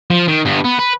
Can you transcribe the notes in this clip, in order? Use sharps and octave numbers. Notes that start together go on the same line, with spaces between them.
F3
D#3
G2 B3
B3
B4